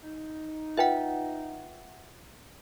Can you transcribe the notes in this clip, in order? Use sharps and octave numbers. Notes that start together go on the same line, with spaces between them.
D#4
F4 B4 E5 F#5 G5